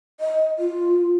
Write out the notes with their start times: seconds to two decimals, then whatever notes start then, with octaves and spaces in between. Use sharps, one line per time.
0.20 D#5
0.59 F4